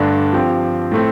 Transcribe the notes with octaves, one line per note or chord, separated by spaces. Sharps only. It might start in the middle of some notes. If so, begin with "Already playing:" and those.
Already playing: G2 D3 A3 D4
F3 C4 G4
A2 A3 C4